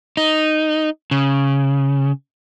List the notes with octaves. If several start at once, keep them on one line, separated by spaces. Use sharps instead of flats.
D#4
C#3